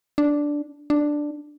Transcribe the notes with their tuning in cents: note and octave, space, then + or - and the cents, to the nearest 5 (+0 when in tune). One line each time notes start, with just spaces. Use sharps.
D4 -5
D4 +5